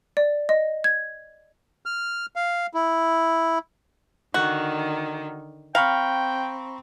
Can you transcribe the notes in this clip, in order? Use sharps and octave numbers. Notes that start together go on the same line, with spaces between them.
D5
D#5
G#6
F6
F5
E4
D3 D#3 F#4
C4 F5 G5 A#5 B5 C#6